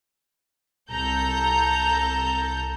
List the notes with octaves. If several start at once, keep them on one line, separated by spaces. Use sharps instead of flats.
C2 A4 A#5 G6